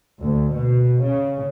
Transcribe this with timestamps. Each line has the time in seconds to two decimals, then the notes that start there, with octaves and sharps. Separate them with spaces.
0.23 D2
0.53 B2
1.03 C#3